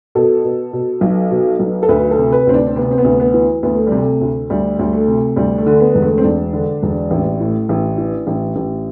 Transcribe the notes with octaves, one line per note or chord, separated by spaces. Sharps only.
B2 A4
B2
B2
B1
B2
B1
A4
D2 B4
A4
C3
B4
D2 C4
D4
C4
C3 B3
C4
B3
D2
B3
E3
D2 B3
A3
C3 G3
A3
D2
D2 G3
D2 G3
A3
C3
D2 G3
A3
D3
B3
E1
A3
C4
E1 D4
D3
E1
A1
A2
A1
E3
A1
A1